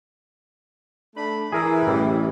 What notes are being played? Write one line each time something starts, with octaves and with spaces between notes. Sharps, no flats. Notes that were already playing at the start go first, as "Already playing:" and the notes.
A3 D4 B5
E3 G#4 A#4 E5
A1 G3